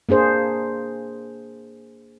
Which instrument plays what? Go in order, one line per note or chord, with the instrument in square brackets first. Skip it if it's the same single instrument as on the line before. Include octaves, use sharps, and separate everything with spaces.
[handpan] A#3 D4 G#4 C5